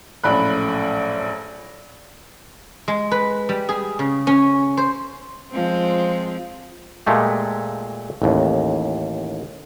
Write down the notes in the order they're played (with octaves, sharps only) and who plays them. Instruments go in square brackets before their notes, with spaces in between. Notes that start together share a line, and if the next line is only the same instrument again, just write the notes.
[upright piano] A#1 F#2 A2 B5 F#6
[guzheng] G#3
B4
G3
G#4
C#3
C#4
C5
[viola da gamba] F3 G#3 C4
[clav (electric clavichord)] A#2 G#3 A3 G4
A1 D#2